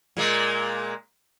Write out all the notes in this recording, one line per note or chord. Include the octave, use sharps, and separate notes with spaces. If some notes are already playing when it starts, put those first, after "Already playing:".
A#2 G#3 A#3